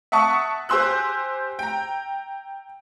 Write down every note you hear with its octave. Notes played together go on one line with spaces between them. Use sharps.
E5 F#5 A5 C#6 D#6
G4 C5 G#5 C6 E6 F#6
G5 A#5